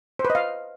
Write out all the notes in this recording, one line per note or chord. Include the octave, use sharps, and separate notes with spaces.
C5
B4
D#5
F5